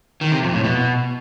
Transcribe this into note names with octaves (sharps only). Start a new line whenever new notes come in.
D#3
C3
F2
A2
B2